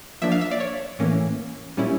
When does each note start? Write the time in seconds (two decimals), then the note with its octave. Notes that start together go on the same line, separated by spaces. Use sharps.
0.22 F3 A#3 D4 E5
0.32 F5
0.41 E5
0.51 D5
0.60 C#5
0.99 A2 E3 A#3 C#4
1.77 A#2 G3 C#4 E4